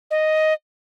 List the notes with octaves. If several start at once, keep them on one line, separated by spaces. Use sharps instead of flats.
D#5